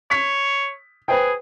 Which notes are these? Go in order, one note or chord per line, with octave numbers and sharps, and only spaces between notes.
C#5 B6
G#4 B4 C5 G5